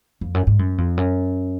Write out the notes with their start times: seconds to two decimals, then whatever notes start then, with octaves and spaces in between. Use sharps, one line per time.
0.21 F2
0.34 F#2
0.47 G#2
0.59 F#2
0.78 F2
0.97 F#2